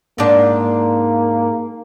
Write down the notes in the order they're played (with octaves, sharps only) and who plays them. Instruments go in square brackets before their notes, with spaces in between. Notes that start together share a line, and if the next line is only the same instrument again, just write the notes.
[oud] G#2 D4 [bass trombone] A#3